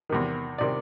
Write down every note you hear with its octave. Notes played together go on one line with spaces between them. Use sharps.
E2 C3 D#3
C3 D#3 D5